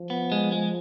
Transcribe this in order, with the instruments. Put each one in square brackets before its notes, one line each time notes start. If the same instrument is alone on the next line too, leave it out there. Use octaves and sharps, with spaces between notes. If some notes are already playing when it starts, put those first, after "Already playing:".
Already playing: [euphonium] F3
[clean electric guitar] B3
G#3
G#3